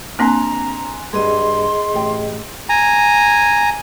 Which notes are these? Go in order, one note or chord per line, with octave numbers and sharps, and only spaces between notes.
A#3 C4 D4 G#5 A#5 C6 F#6
G2 G3 G#4 D#5 C6
A1 G4 G5
G#5 A#5